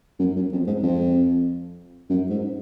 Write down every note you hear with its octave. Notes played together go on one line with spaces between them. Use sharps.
F#2
F#2
F2
G#2
F2
F#2
G#2